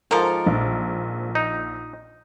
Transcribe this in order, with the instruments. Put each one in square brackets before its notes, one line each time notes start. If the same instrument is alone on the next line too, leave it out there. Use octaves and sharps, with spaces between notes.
[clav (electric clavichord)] G#2 F3 [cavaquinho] A4 A#4
[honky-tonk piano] A#1
[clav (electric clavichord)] D#4